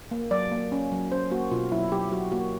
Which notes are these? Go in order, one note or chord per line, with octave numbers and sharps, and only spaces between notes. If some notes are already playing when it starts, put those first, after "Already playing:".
A#3
F#3 D5
A#3
C#4
F#3
C#4 C5
A#3 F#4
B2 F4
F#3 E4
F#3 G4
F#3 F#4
A#3 F#4